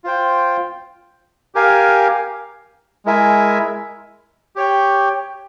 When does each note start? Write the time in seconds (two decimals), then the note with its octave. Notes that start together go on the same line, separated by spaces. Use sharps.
0.04 F4 C5 G5
1.55 G4 A#4 F5 G#5
3.06 G#3 E4 A#4 E5 G#5
4.56 G4 C#5 G5